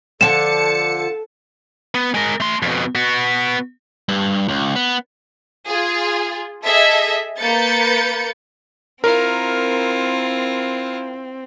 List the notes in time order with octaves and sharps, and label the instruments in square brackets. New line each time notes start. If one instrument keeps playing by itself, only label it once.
[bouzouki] D3 F3 [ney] A4 [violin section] A5 C#7 [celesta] E7
[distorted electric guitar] B3
G#3 A#4
A3 C6
F2 B2
B3 F#4
[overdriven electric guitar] G2
C#2
B3
[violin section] F4 G#4
G#4 A4 D#5 E5
A#3 B4 G6 A6 C#7
[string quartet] C4 [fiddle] E4 F4 [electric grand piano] A#4